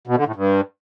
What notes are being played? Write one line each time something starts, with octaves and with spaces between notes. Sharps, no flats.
B2
D3
A2
G2